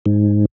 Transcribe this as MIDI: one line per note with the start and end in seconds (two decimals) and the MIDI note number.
0.06 0.45 44